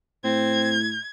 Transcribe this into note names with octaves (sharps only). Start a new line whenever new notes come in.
A2 C4 G#6